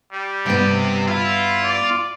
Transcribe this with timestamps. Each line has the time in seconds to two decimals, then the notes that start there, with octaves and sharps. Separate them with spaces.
0.12 G3
0.46 G2 C3 B3 G5
1.08 E4 F4
1.63 D5